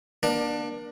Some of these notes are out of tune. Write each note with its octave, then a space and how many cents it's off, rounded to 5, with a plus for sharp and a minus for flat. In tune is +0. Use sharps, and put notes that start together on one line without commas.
A#3 +35 D4 +15